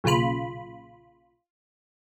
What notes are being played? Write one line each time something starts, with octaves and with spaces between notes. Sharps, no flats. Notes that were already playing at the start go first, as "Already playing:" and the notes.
B1 A#2 C#3 F4 B5